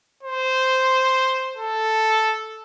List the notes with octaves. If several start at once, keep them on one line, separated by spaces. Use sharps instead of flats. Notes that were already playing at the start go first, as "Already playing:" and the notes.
C5
A4